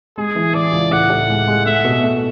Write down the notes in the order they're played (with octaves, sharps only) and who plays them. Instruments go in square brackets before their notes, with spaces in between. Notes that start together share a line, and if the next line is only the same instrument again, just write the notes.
[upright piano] G#3 [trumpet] G#4
[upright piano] E3
[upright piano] E3 [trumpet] D5
[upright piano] C#2
[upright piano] A2 [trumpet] F#5
[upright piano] A2
G#3
G#3
[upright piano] A3 [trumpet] E5
[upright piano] B2
A3